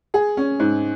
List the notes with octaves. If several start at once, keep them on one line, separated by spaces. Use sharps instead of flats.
G#4
C#4
G#2